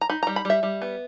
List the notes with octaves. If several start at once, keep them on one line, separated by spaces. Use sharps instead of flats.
A#5
D#4 B5
G3 A#5
B5
G3 E5
G3
B3